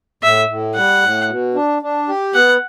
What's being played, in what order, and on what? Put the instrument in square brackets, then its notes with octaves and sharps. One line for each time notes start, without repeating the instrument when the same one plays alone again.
[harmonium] A2 [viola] E5
[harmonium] A2
[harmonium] G3 [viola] F#5
[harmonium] A2
B2
D4
D4
G4
[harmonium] B3 [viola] F#5